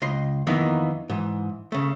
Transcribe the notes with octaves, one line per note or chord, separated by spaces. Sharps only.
C#2 D#5 C6
F2 D#3 E3 A#3 B3 D#4
G#2 E3
C#3 A3